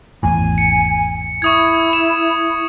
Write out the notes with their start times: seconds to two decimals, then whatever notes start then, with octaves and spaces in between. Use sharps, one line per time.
0.23 G#1 E2 A2 G#5
0.58 C#7
1.42 E4 C#6 D#6 G#6
1.93 E7